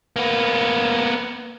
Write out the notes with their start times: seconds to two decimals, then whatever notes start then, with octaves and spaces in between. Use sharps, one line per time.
0.16 A#3 B3